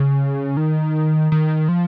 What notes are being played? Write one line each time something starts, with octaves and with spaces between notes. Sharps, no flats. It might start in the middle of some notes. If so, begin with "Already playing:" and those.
Already playing: C#3
D#3
D#3
F3